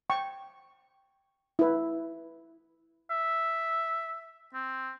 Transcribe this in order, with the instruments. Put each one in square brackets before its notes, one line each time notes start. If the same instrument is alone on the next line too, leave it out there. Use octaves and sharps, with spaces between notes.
[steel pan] G5 C#6
E4 B4
[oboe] E5
C4